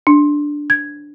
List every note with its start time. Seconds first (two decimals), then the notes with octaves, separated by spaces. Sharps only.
0.07 D4
0.70 G#6